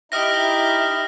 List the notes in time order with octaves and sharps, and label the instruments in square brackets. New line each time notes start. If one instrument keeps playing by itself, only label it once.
[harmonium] D#4 E4 [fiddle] G4 [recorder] E5 [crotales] D#6 F6 A#6